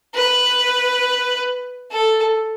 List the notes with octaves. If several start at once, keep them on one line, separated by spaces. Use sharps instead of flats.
B4
A4